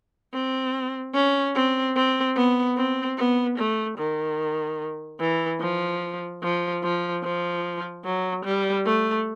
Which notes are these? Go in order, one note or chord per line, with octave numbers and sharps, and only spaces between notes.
C4
C#4
C4
C4
B3
C4
B3
A3
D#3
E3
F3
F3
F3
F3
F#3
G3
A3